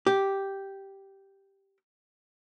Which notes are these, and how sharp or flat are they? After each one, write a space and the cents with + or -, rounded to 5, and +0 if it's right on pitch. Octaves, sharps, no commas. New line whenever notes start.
G4 -5